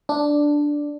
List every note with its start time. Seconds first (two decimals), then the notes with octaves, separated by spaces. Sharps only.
0.09 D4